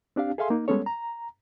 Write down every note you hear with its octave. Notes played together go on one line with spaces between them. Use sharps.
C4 D4 G4 F5
G#4 A4 E5 F5 G#5 C6
A#3 D#4
G3 G#3 B3 C#4 A4 C#5
A#5